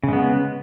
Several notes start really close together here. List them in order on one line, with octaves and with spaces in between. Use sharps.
C#3 G#3 B3